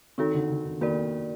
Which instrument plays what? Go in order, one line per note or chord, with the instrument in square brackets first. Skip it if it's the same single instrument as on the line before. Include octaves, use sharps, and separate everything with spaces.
[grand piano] D#3 [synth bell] C4 D#4 F#4 A4
[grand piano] D3
D3
D#3
[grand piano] D#3 [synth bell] A#3 F#4 A#4 D5